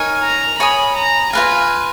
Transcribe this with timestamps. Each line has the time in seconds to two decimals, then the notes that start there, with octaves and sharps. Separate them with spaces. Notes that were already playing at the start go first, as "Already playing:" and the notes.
Already playing: D#4 A#4 C#5 G#5
0.23 A#5
0.60 C#5 G#5 B5 D#6
0.97 A#5
1.33 F4 B4 F5 G#5